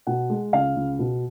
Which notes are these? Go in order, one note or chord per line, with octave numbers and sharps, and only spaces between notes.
B2 F#5
G#3
C#2 F5
C#2
B2